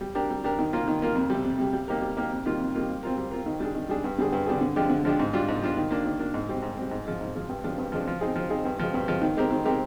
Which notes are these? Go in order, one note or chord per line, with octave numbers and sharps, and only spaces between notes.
G3
D4 G4 A#4
G3
D4 G4 A#4
D#3
A#3 F4 A#4
D#3
A#3 F4 A#4
F2
C3 G3
F2
C3 G3
G3
A#3 D#4 G4 A#4
G3
A#3 D#4 G4 A#4
F2
D#3 G3 A#3 F4
F2
D#3 G3 A#3 F4
G3
C4 F4 A#4
G3
C4 F4 A#4
D#3
G3 D4 G#4
D#3
G3 D4 G#4
G2
D3 G3 D4 G#4
G2
D3 G3 D4 G#4
D3
F3 G#3 D4 G4
D3
F3 G#3 D4 G4
G#2
G3 D4 F4
G#2
G3 D4 F4
D#3
A#3 D4
D#3
A#3 D4
G#2
G3 C4
G#2
G3 C4
G#2
F3 G#3
G#2
F3 G#3
G2
F3 G#3 D4
G2
F3 G#3 D4
F3
C4 D#4 G#4
F3
C4 D#4 G#4
G2
F3 G#3
G2
F3 G#3
D#3
G#3 C4 G4 A#4
D#3
G#3 C4 G4 A#4